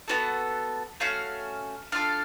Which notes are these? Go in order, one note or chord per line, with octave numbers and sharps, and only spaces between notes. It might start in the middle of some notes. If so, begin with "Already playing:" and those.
B3 D4 F#4 A4
A3 C#4 F#4 F5
D4 F4 A4 F5